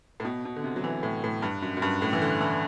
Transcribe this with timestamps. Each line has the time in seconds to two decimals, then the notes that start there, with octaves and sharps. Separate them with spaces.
0.20 A2
0.25 B2
0.45 B2
0.56 D3
0.64 C3
0.76 F#3
0.84 E3
1.03 A2
1.24 A2
1.42 G2
1.62 F#2
1.77 F#2
1.82 G2
2.02 A2
2.13 E3
2.22 D3
2.41 E3